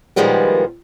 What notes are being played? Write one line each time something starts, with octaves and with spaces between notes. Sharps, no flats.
A#2 D#3 F3 G3 G#3 B3